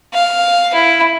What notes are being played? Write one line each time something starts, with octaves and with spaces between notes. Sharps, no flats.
F5
E4